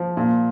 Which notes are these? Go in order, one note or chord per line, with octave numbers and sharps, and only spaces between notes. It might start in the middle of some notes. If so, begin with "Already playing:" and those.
Already playing: F3
A#2